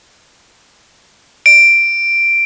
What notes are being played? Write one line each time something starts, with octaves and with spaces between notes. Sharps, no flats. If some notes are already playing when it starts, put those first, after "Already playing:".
D7